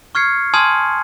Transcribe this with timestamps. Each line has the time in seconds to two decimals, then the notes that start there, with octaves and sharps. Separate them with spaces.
0.15 C#6 F6 G#6 C7 C#7
0.54 G#5 A5 C6 D#6 F6 G#6